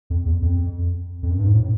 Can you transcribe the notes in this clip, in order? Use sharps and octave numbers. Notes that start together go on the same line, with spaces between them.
F2
E2
F2
F2
F#2
G2
G#2
A2